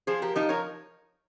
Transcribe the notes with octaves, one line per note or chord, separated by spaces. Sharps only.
F3 G#4 C5
G4 A#4
F3 D#4 G4
A#4 C#5